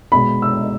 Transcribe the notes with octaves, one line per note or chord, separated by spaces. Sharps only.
B2 G#3 B5
E6